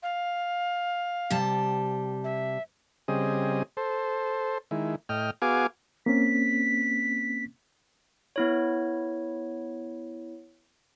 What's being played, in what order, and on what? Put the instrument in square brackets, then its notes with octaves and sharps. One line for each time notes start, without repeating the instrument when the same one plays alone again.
[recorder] F5
[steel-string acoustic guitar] C3 G3 A5
[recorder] E5
[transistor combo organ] C#3 G3 C4 G#4 D#5
A4 C5
D#3 G#3 E4
A2 D#5 G5 F6
B3 F#4 G#4 F5 G#5 D6
[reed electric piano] A#3 C4 C#4 [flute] B6
[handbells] B3 E4 C#5